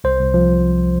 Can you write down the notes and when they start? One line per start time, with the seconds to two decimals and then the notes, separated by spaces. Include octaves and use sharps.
0.04 C2 C5
0.19 C2
0.34 F3